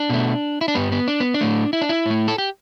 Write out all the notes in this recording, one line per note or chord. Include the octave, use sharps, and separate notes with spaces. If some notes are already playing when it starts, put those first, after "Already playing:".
Already playing: D4
B2 A3
E4
D4
G2 G3 B3
B3
D4
B3
D4
A2 A3
E4
D4
E4
A2 A3
A4
G4